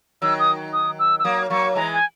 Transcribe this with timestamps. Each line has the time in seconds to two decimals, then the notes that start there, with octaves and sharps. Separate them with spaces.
0.22 D#3 F#3 E6
0.39 D#6
0.73 D#6
0.99 E6
1.19 E6
1.24 F#3 A#3 D#6
1.50 F#3 A#3 C#6
1.75 E3 G#3 A#5
1.93 G#5